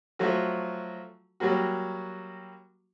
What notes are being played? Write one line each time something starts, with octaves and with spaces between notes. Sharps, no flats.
F3 F#3 A3 F#4
F#3 G3 A#3 F#4